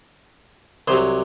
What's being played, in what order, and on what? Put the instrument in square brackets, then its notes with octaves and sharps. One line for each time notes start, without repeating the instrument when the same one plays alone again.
[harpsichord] C2 C3 F#3 G#4 C5